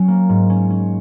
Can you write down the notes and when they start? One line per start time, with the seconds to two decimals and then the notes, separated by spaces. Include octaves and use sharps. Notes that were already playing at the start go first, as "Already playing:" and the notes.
Already playing: F#3 C#4
0.08 A#3
0.29 G#2
0.50 C#4
0.70 C#4